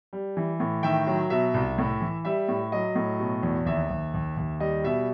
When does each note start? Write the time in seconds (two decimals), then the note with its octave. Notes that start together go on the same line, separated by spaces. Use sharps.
0.13 G3
0.37 E3
0.60 A2
0.83 D#3 E5 G5
1.07 F#3
1.30 B2 E5
1.54 C2
1.78 A2
2.01 E3
2.25 G3 E5
2.48 A2
2.72 F#3 D#5
2.95 A2
3.20 B2
3.43 E2
3.66 D#2 E5
3.90 D#2
4.14 D#2
4.37 D#2
4.60 G3 D#5
4.84 B2 E5